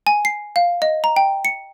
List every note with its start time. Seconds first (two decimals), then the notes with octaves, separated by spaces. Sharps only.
0.07 G#5
0.25 C7
0.56 F5
0.82 D#5
1.04 A#5
1.16 G5
1.45 C#7